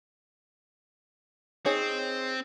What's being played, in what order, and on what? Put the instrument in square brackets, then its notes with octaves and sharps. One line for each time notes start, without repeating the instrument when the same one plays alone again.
[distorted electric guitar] C4 [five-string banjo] D#4 G#4 C#5